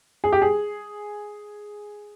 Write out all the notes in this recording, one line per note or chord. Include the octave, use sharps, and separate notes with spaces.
G#4
G4
G#4